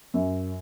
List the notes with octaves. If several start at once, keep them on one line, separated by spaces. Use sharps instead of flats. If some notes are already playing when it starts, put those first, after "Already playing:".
F#2